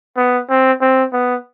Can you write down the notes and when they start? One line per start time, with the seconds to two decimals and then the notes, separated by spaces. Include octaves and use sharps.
0.17 B3
0.49 C4
0.81 C4
1.13 B3